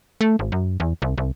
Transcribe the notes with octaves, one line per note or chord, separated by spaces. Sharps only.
A3
G#1
F#2
E2
C2
C2